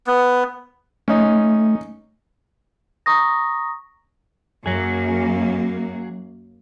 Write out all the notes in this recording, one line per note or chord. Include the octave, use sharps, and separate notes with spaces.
B3
A3 C#4 D#4
A#5 C#6 D#6 A#6
F#2 F#3 A#3 G#4